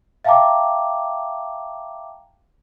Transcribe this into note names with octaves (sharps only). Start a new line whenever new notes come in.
E5 F5 G5 A5 A#5 D6